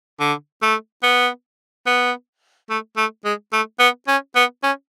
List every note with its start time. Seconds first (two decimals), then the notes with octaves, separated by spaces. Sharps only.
0.20 D3
0.62 A3
1.03 B3
1.87 B3
2.70 A3
2.97 A3
3.25 G#3
3.53 A3
3.80 B3
4.08 C#4
4.36 B3
4.63 C#4